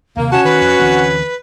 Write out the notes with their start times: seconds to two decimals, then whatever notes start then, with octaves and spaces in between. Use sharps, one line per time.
0.17 D#2 C3 A#3
0.31 C#4 F#4 A5
0.45 D#3 B4
0.61 F2
0.80 D2 E3 C4